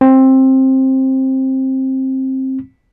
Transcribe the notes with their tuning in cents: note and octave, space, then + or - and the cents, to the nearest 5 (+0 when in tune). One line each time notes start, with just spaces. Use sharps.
C4 +15